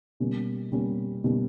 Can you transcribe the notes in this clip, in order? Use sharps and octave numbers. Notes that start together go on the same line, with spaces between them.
B2 G3 A#3 C#4
B2 G3 A#3 C#4
B2 G3 A#3 C#4